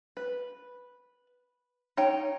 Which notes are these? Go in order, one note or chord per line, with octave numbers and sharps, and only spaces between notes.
B4
D#4 C#5 G5